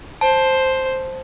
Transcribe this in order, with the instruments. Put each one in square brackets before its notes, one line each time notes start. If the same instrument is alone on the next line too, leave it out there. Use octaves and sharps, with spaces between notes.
[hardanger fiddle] C5 [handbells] A5